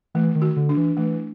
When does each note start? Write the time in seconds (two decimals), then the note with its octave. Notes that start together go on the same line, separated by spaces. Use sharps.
0.15 E3 A3
0.35 D#3
0.42 F#4
0.56 D3
0.69 D4
0.77 E3
0.97 E3 A3